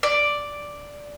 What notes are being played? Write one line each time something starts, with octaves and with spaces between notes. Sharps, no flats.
D5